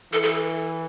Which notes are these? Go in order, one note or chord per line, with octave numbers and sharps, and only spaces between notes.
E3 A4
A4